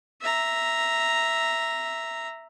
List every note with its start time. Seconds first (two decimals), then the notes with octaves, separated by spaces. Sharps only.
0.22 E5 A#5